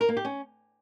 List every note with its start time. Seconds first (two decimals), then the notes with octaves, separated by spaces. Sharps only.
0.01 A#4
0.09 A#3
0.17 G4
0.25 C#4